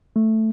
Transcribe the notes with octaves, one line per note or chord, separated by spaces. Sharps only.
A3